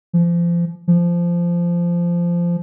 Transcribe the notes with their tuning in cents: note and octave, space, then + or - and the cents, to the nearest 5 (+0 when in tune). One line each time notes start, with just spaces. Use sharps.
F3 -30
F3 -15